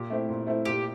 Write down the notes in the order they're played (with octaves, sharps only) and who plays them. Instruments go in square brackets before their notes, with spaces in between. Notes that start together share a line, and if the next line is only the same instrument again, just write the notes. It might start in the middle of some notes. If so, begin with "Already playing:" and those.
Already playing: [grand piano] A#2 [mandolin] G4
[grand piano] A3 C4 E4
A#2
A3 C4 E4
[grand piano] A#2 [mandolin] G4